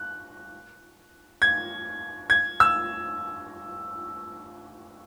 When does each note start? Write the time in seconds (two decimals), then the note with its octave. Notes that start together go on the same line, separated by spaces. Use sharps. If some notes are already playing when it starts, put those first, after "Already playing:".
Already playing: F#6
1.42 G#6
2.30 G#6
2.60 E6